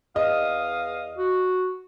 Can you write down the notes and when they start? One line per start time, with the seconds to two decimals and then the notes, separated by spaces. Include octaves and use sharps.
0.16 E2 D#5 F5 D#6
1.18 F#4